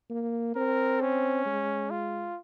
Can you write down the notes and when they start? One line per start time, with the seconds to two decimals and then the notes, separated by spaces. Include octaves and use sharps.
0.10 A#3
0.56 C4 A#4
1.01 C#4
1.46 G#3
1.91 F4